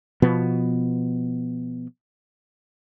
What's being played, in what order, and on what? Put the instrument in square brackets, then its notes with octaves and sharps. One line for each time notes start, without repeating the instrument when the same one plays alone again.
[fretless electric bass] B2 F3 B3